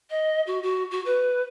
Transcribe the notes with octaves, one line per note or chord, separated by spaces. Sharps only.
D#5
F#4
F#4
F#4
B4